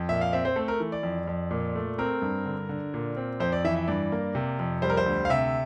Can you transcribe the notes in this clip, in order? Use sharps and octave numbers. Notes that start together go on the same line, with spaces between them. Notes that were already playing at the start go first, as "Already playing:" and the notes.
Already playing: F2
A#2 E5
F5
C4 E5
C5
A3 A4
A#4
E3
D5
F2
F2
A#2
A3
C4 A#4
G2
D3
D3
A#2
C4
F2 C5
D5
E3 E5
E5
G2 D5
A#3
C3
F2
G3 C5
A#4
C5
D2
F5
C3 E5